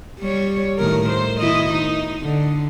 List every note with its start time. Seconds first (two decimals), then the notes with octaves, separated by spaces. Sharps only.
0.20 G3 C#5
0.79 A2 D#3 A#4
1.09 C5
1.40 D#3 E4 D#5
1.73 D#4
2.22 D3